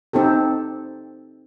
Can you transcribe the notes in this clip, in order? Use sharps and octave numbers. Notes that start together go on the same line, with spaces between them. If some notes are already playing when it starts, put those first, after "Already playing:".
C4 D#4 G4 A4